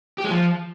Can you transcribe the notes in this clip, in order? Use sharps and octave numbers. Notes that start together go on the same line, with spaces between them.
G4
G#3
F3